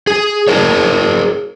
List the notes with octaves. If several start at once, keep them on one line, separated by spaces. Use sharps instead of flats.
G#4
G#4 A#4 C#5